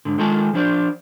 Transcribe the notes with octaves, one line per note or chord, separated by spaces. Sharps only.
G#2 D3
D#3 G#3 F4 A4 G#5 A5
F3 D4 C5 D5